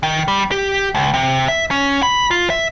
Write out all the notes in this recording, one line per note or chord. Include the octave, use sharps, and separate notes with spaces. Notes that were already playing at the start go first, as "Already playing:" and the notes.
D#3
G3
G4
C#2
C3
E5
C#4
B5
F4
E5